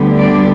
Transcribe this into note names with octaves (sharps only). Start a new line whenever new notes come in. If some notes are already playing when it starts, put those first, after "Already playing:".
Already playing: D2 D3 G3 B3
D4 D5